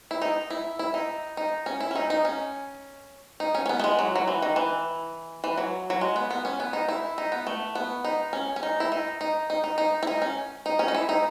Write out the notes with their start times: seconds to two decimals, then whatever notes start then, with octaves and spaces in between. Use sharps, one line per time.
0.11 E4
0.22 D#4
0.50 E4
0.79 E4
0.94 D#4
1.37 D#4
1.66 C#4
1.80 E4
1.91 C#4
1.96 D#4
2.10 D#4
2.25 C#4
3.40 D#4
3.55 C#4
3.66 C#4
3.69 B3
3.79 A3
3.84 G#3
3.99 F#3
4.16 F#3
4.27 E3
4.42 D#3
4.56 E3
5.44 E3
5.57 F#3
5.90 F#3
6.01 G#3
6.16 B3
6.31 B3
6.45 C#4
6.60 B3
6.73 D#4
6.89 E4
7.18 D#4
7.32 B3
7.47 A3
7.75 B3
8.05 D#4
8.33 C#4
8.56 C#4
8.63 D#4
8.80 E4
8.92 D#4
9.21 D#4
9.50 D#4
9.64 D#4
9.78 D#4
10.03 E4
10.07 D#4
10.22 C#4
10.66 D#4
10.79 C#4
10.88 D#4
10.95 E4
11.09 D#4